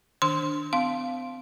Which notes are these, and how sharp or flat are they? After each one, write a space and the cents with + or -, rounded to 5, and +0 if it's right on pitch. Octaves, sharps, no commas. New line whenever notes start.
D#3 +0 D4 +0 C6 +0
C4 -45 F5 -5 C6 +0